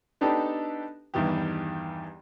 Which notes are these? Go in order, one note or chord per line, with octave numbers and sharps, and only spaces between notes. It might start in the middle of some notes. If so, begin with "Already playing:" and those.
B3 D4 D#4 G4 A4
E2 G2 D#3 E3 G4